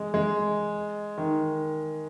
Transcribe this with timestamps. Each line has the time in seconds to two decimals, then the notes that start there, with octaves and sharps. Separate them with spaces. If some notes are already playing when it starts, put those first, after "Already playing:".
Already playing: G#3
0.14 G#3
1.18 D#3